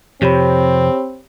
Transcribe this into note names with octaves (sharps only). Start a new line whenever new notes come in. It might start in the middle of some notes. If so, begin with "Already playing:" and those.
F2 C3 C4 G4 C#5 B5